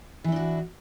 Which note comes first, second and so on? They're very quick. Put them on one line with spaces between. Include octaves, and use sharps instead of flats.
E3 E4 D4 F#4